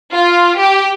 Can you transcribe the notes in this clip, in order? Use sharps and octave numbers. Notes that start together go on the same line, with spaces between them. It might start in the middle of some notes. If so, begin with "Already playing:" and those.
F4
G4